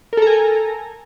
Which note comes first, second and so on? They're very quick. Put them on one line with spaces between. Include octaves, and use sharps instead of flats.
A#4 A4 A#5 G#5